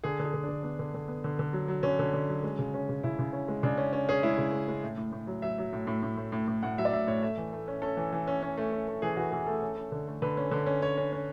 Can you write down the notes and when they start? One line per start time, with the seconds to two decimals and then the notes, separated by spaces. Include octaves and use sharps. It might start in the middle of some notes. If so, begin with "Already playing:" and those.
0.04 D3 G#4
0.19 D3 G#4
0.34 D3
0.43 D4
0.49 D3
0.63 B3 D4
0.79 D3
0.94 D3
1.08 B3
1.24 D3
1.39 D3
1.53 F#3
1.68 F#3
1.83 D3 C#4
1.99 D3
2.13 D3
2.29 F#3
2.43 G#3
2.59 C#3
2.74 C#4
2.89 C#3
3.03 C#3 E4
3.19 C#3
3.33 C#4
3.48 G#3
3.63 C#3 D4
3.78 C#4
3.93 C#4
4.09 C#4 G#4
4.23 G#3 E4
4.38 C#3
4.53 G#3
4.68 G#3
4.83 A2
4.97 A2
5.12 A2
5.27 F#3
5.42 F#3 E5
5.58 F#3
5.73 A2
5.87 A2
6.03 A2
6.17 A2
6.32 A2
6.47 A2
6.63 A2 F#5
6.78 F#3 E5
6.85 D5
6.93 A2 E5
7.07 A2 C#5
7.22 A3 E5
7.37 E3
7.53 A3
7.68 C#4
7.82 C#4 A4
7.97 E3
8.13 E3
8.27 C#4
8.42 C#4
8.57 A3
8.72 C#4
8.88 A3
9.02 E3 G#4
9.17 E3 F#4
9.32 E3 G#4
9.46 A3 A4
9.62 C#4
9.76 C#4
9.92 D3
10.08 A3
10.22 D3 B4
10.37 C#4
10.51 D3
10.66 C#4
10.82 C#4 C#5
10.97 C#4
11.12 C#4